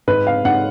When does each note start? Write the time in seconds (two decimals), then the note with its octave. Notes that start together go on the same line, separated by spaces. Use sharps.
0.07 G#2 B4
0.27 F5
0.45 G#2 F#5